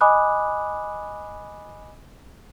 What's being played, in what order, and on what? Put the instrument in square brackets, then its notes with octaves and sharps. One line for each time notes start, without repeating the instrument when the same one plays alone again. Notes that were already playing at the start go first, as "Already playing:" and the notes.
[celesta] D#5 G#5 B5 D6 D#6 F#6